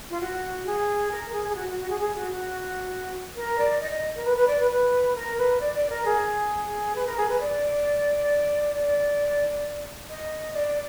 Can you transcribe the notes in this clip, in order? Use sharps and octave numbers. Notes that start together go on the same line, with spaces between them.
F4
F#4
G#4
A#4
G#4
G#4
F#4
F#4
F#4
G#4
G#4
F#4
F#4
A#4
D5
D#5
A#4
B4
B4
D5
B4
B4
A#4
B4
D5
D5
A#4
G#4
B4
A#4
G#4
B4
D5
D5
D#5
D5